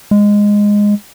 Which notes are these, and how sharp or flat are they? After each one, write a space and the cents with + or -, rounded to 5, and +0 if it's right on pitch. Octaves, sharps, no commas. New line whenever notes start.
G#3 -10